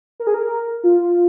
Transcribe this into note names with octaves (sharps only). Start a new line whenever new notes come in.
A#4
G#4
A#4
F4